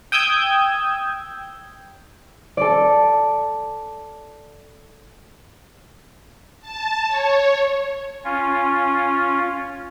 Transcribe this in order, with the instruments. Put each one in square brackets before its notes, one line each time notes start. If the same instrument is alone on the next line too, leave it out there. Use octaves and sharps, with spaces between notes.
[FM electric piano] G5 D#6 E6 G6 G#6
[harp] A4 D5
[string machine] A5
C#5
[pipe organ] C#4 F4